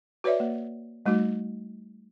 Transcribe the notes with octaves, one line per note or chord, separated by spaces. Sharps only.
F#4 B4 C#5 D5 E5
A#3
G3 A3 D#4 F#4